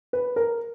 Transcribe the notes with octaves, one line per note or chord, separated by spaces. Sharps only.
B4
A#4